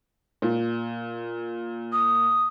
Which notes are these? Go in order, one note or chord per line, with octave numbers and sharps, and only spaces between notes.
A#2
D#6